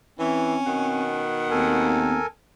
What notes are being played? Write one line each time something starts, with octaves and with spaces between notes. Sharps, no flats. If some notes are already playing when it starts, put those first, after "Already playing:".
E3 C4 C#4
B2 D#3 F#5
D#2 B3 C4 A4 A#4 G#5